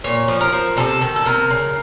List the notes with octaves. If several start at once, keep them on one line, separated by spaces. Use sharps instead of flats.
A#2 C#5
F3
A#4
F3
C3 A4
D#3 A4
A4
C3 A#4
C#3